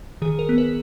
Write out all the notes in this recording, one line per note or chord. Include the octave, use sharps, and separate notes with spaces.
D#3 G#4
A#4
B3
B4